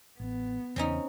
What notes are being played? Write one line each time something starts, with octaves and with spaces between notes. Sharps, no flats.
A1 B3
E2 C#3 C4 C#4 D#4